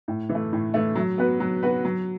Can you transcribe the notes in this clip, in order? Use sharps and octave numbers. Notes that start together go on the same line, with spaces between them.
A2
E3
A3
A2
E3 A3
F#3
B3 F#4 B4
F#3
B3 F#4 B4
F#3